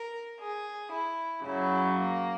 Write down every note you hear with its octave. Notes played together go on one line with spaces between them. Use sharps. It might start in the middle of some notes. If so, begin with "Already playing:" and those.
Already playing: A#4
G#4
E4
F#2 C#3 F#3 E4
A#3